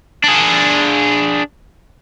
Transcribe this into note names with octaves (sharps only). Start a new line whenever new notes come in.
D4 G#4